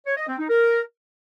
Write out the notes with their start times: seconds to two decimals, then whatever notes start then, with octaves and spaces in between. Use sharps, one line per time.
0.06 C#5
0.17 D#5
0.28 C4
0.39 D#4
0.50 A#4